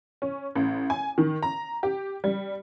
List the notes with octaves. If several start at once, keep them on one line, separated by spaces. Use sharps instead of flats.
C#4
A1
G#5
D#3
A#5
G4
G3